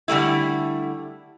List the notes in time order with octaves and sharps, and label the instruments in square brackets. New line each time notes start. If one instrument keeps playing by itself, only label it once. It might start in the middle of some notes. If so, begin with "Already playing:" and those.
[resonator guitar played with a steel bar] D3 G3 A3 E4